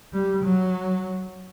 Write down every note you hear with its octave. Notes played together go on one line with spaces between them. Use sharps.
G3
F#3